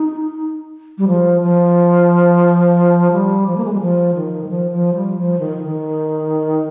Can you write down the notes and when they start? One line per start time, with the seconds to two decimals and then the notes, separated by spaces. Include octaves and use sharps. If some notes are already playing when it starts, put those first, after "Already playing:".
Already playing: D#4
0.98 G3
1.08 F3
1.42 F3
3.12 G3
3.47 F3
3.57 A#3
3.65 G#3
3.73 G3
3.81 F3
4.15 D#3
4.44 G3
4.49 F3
4.72 F3
4.95 G3
5.18 F3
5.40 D#3
5.63 D#3